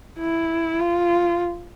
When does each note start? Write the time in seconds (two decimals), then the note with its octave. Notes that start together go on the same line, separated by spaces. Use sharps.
0.19 E4
0.79 F4